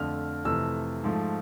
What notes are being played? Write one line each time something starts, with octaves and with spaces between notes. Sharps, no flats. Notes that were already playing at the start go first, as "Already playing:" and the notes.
Already playing: F2 D3 F3 A3 F6
F2 C3 E3 A3 E6
G#2 F3 A3